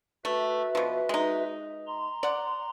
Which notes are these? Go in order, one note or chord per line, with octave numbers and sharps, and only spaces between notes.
A3 F#4 B4 E5
B2 F3
G#3 D#4
A#5 C6
D5 F#5